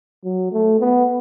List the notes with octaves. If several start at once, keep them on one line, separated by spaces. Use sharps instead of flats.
F#3
A3
B3